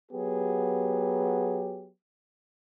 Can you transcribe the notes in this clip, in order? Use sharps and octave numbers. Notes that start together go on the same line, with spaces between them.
F#3 B3 G4 G#4